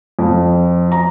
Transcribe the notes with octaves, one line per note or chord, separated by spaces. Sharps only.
F2
A#5